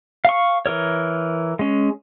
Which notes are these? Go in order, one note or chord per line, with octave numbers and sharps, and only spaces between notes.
F5 C#6
E3 A#4 C#5
G#3 C#4